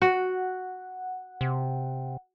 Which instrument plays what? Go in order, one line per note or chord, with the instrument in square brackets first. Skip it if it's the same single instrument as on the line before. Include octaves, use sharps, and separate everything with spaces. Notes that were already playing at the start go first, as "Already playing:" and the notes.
[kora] F#4 [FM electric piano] F#5
[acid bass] C3